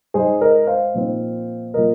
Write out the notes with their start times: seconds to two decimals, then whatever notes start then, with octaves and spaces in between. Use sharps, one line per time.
0.14 G#2 G#3 D#4 G#4 C5
0.41 A#4 D#5
0.67 C5 F5
0.94 A#2 F3 C4 D#4
1.74 A#2 F3 A#4 D#5